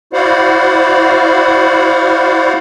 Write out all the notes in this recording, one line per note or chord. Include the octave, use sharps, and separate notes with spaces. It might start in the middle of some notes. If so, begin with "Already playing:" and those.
E4 F#4 C5 D5 F5 F#5